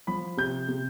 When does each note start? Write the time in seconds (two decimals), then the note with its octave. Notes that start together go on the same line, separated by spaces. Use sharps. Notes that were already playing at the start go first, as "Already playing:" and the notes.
0.07 F3 B5
0.37 C3 G6
0.68 C3